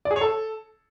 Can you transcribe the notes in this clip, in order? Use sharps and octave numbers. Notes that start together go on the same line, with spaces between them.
D5
G#4
C#5
A4